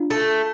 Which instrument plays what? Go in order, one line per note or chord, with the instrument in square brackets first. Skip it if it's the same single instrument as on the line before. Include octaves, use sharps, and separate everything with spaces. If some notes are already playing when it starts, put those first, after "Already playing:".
Already playing: [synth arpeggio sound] D4 F4
[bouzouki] A3